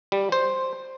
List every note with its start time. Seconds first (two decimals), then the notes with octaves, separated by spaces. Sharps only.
0.12 G3
0.32 C5